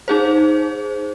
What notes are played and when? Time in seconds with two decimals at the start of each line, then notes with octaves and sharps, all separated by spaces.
0.08 D#4 G#4 C5